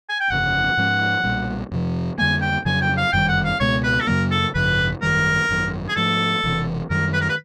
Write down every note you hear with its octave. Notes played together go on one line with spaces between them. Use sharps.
G#5
G5
G1 F2 C#3 F#5
G#2 F3 G#3 C#4
B1 A#2 G3 A#3
F2 C3 F3
F2 D3 G3 A#3 G#5
G5
F2 C#3 F#3 G#5
G5
F5
G1 F#2 D#3 G3 G5
F#5
F5
C#2 B2 G#3 B3 C#5
B4
A4
F#2 C#3 F#3 A#3 A#4
A4
G#1 F#2 C#3 F3 B4
G#1 F#2 D#3 G3 A#4
G#1 F#2 D#3
G#4
G#2 F3 A3 A4
E1 E2 C3 E3
F#2 D#3 G3 A#4
B4
A#4
B4